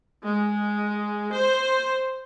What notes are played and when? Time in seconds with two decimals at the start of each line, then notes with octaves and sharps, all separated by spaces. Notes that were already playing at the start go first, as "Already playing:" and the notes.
0.24 G#3
1.32 C5